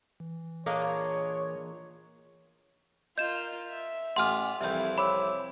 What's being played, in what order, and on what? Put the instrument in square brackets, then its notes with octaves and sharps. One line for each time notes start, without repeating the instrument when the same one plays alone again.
[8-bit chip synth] E3
[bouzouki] A#2 G#4 D#5 [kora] A#3 D4 A#4 [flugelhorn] C#5
[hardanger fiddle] F4 A#4 [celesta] D#5 [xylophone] G6 E7
[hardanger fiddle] E5
[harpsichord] A1 F4 D#6 [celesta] F#5 G#5 D6 [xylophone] C6 F6
[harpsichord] C2 F2 E3 [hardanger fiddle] C4 E4 [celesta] E5 G6
[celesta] C#5 D6 E6 [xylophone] B5